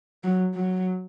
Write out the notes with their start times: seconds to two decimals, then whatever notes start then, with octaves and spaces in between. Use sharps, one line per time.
0.24 F#3
0.54 F#3